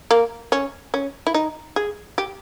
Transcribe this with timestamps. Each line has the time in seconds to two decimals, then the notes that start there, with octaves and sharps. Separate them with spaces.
0.11 A#3
0.52 C#4
0.94 C#4
1.27 E4
1.34 D#4
1.76 G#4
2.18 G4